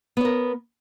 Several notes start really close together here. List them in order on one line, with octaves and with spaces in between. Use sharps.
B3 C#5 A#4